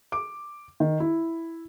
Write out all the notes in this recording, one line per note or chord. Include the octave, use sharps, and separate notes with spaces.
D6
D#3
E4